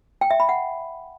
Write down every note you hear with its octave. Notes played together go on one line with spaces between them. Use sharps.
G5
E5
B5
F#5